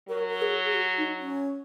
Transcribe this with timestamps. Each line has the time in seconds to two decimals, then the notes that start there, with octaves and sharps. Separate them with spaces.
0.08 F#3 A#4
0.30 A#4
0.41 G#4
0.65 G#4
0.75 F#4
0.97 D#4
1.20 C#4